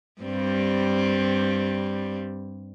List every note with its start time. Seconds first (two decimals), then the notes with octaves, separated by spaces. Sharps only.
0.22 G2 G3 C4